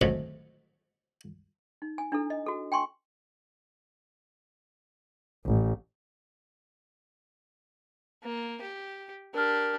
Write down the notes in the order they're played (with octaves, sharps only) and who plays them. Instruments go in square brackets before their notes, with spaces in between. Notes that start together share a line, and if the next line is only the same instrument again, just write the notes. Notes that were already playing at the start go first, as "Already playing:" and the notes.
[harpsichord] A1 D2 C3 D#3 F#3 A3
[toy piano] D#4
G#5
D4 E4 A4
D#5
F#4 A4
G5 G#5 C6 C#6
[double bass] A1
[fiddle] A#3
G4
[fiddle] D4 G4 [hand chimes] A#4 F6